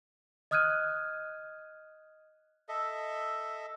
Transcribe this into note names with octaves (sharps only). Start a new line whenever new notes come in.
D#5 D#6 F6 F#6 G#6 D#7
A4 D#5 E5